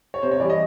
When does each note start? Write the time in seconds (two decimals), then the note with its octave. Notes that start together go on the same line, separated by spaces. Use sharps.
0.14 C#5
0.22 C3 C5
0.31 C#5
0.40 E3 G3 D5
0.50 D#5